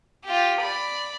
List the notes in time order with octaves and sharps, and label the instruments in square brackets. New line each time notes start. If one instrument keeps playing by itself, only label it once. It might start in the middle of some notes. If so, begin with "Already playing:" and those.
[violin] F4 G4
D5 B5